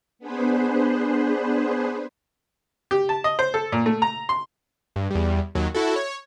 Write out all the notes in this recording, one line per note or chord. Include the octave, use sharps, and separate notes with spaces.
B3 D4 G#4 B4 C5
G4
A5
D#5
C5
A4
A#2
A3
A#5
C6
G2
E2 G3
D#2 F#3
E4 F#4 A4
C#5